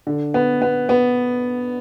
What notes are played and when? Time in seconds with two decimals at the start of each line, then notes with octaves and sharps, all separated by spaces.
0.07 D3
0.34 B3
0.62 B3
0.89 B3